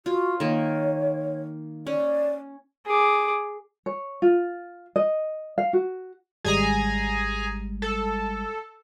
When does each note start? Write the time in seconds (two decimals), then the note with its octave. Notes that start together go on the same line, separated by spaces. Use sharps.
0.06 F4 F#4
0.40 D#3 A#3 C#5
1.87 C#4 D5
2.86 G#4 D6
3.86 C#5
4.22 F4
4.96 D#5
5.58 F5
5.73 F#4
6.45 G#1 G3 G#3 G#4 G#5 A#5
7.82 A4